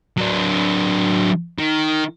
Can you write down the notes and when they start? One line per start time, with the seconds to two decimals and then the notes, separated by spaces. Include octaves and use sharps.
0.18 F#3 D4
1.59 D#3